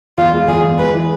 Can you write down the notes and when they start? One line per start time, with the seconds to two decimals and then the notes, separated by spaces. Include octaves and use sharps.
0.18 E2 F4
0.33 G#3
0.48 E2 G#4
0.63 E2
0.79 G#3 B4
0.94 E3